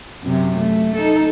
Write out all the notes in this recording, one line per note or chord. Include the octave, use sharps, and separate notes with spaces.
F#2 C3
A3
D#4 A4